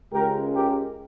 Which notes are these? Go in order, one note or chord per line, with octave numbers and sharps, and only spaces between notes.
C#2 C#3 G#3 G4 A#4
G4 A#4